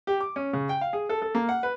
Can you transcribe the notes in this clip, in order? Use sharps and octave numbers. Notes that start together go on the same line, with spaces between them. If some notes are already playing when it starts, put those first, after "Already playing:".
G4
D6
C#4
C#3
G5
F5
G#4
A4
A4
A#3
F#5
B4